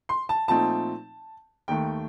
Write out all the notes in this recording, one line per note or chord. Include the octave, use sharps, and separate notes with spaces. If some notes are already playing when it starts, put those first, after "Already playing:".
C6
A5
A#2 F3 A3 C4 D#4 A5
D#2 D#3 A3 G5